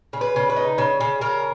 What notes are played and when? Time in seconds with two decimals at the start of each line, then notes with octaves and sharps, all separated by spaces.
0.13 C#3
0.21 B4
0.36 C#3
0.50 B4
0.56 D#4
0.78 C#3
1.00 C#3
1.21 C#3 A#4